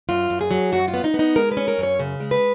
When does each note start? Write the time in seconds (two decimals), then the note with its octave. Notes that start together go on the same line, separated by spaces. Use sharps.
0.09 F#2 F4
0.30 F#2
0.41 G#4
0.51 F#3
0.72 F#2 F#4
0.88 F4
0.94 B3
1.04 D#4
1.14 B3
1.19 D#4
1.36 G#3 A#4
1.51 B4
1.57 C#4
1.68 A#4
1.78 F#2
1.83 C#5
1.99 C#3
2.20 G#3
2.31 B4